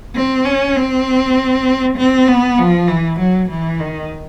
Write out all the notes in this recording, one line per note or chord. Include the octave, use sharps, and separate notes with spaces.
C4
C#4
C4
C4
B3
F3
E3
F#3
E3
D#3